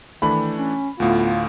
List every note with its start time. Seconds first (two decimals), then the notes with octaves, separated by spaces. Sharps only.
0.22 D#3 E3 A3 D4 B5
0.57 C#4
1.00 D2 A2 B3 F4